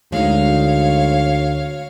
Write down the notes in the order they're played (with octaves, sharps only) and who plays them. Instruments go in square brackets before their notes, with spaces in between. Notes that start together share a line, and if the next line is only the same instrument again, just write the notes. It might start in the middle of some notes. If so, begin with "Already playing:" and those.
[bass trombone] D2 [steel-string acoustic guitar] G#3 D#4 [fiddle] C#5 F5